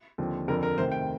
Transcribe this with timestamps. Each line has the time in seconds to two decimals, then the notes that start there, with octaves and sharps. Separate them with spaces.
0.18 D#2 D3 F3 C4
0.48 F2 D3 F3 A#4
0.63 A#4
0.77 D2 C3 D#3 C5
0.92 G5